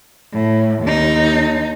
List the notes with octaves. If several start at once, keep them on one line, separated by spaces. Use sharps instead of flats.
A2
D#2 D#4